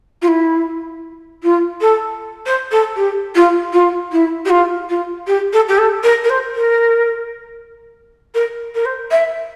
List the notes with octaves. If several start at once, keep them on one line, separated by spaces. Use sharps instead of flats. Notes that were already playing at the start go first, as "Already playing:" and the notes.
F4
E4
F4
A4
C5
A4
G4
F4
F4
E4
G4
F4
F4
G4
A4
G4
A4
A#4
A#4
C5
A#4
A#4
A#4
C5
E5